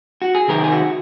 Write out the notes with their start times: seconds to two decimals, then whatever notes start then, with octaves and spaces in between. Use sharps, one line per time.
0.22 F#4
0.35 G#4
0.48 C3 D#3 G#3 C4 A#4
0.64 G#4
0.72 F#4